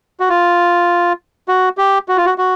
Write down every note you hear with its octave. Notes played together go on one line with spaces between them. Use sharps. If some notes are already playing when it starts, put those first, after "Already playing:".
F#4
F4
F#4
G4
F#4
F4
F#4
F#4